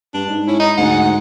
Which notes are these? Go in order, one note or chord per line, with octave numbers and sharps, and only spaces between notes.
G2 D4
G#2
C#4 E4
D#4
D2 G#2 F#5